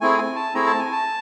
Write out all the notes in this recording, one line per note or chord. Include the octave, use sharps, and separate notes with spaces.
A3 C4 E4 G#4 G#5
G#5
A5
A3 C4 E4 G#4 A#5
A5
G#5
A5